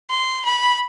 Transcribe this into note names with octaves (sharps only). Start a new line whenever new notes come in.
C6
B5